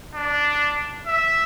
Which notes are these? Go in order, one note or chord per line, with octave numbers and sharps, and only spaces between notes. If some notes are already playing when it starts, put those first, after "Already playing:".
D4
E5